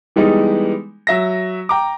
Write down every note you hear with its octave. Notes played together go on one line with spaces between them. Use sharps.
E3 G3 G#3 B3 D#4
F#3 E5 A#6
G5 A#5 D6